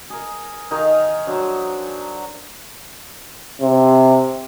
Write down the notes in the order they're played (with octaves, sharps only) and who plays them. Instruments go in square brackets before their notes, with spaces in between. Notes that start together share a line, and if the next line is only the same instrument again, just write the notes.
[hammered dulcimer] G#4 A#4
D#3 D#4 G#4 F5
F#3 D4 C5
[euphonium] C3